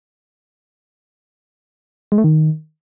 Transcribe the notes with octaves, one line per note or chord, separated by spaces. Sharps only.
G#3
A3
D#3